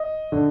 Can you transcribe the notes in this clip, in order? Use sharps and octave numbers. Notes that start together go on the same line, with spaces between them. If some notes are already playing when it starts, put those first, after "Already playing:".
Already playing: D#5
D3